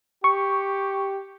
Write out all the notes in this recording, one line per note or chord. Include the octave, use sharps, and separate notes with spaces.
G4 C#6